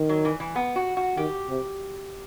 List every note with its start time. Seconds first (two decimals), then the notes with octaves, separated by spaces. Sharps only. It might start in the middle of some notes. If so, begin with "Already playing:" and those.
Already playing: D#3
0.09 F#3
0.25 E3
0.40 E3
0.56 B3
0.76 F#4
0.97 F#4
1.17 D#3 G4
1.49 C3